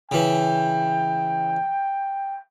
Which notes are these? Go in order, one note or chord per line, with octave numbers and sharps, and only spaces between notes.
C#3 E3 G5